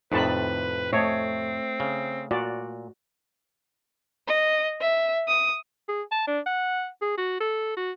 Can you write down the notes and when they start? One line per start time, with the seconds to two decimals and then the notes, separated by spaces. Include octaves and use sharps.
0.12 F2 A2 C3 D#4 B4 A5 B5
0.93 A3 C4 C#5 D#5
1.80 C#3
2.31 A#2 F#4 D5
4.28 D#5
4.81 E5
5.28 D#6
5.89 G#4
6.11 A5
6.27 D4
6.46 F#5
7.02 G#4
7.18 F#4
7.40 A4
7.77 F#4